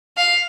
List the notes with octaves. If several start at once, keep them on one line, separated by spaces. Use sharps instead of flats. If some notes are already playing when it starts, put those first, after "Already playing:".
F5